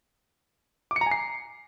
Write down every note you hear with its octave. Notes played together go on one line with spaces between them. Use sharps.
D6
C#7
A#5
G#5
C7